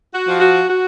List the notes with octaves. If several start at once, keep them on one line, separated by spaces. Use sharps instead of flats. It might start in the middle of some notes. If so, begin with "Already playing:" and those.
F#4
F3
F#4
F#4